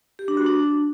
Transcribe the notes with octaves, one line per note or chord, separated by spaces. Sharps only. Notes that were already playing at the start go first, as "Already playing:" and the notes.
G4
D4
F#4
D4